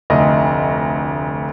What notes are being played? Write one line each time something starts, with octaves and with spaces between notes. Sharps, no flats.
F1 D2 D#5